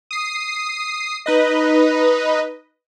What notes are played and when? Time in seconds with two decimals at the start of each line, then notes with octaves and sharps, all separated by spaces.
0.11 D#6 C7
1.26 D#4 B4 D#5